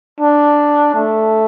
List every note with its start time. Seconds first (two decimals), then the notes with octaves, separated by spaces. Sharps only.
0.21 D4
0.95 A3